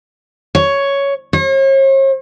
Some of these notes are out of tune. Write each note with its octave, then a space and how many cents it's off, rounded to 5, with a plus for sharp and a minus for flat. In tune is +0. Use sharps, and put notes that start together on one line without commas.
C#5 +5
C#5 -45